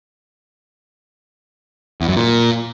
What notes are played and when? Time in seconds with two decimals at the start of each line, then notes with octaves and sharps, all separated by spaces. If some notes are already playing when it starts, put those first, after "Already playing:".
2.01 E2
2.09 F#2
2.17 A#2